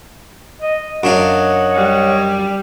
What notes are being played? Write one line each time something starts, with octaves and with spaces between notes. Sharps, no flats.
D#5
F#2 D4 C#5 D#5 F5 F#5
G3